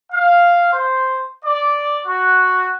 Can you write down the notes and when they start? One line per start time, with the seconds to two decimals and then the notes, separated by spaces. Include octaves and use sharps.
0.12 F5
0.73 C5
1.44 D5
2.06 F#4